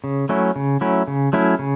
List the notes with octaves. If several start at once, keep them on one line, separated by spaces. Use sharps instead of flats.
C#3
F#3 A3 C#4 E4
C#3
F#3 A3 C#4 E4
C#3
F#3 A3 C#4 E4
C#3